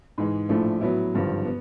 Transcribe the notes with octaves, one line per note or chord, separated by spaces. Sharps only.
G#2 E3 G#3
A#1 A2 F3 A3 D4
A2 F#3 B3 E4
G#1 G2 D3 F3
B3